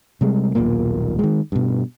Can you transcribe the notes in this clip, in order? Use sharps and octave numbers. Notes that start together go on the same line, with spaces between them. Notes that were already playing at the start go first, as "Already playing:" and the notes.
C3 G3 G#3
D#1 B1 A#2 A#3
D#3 G#3
G2 B2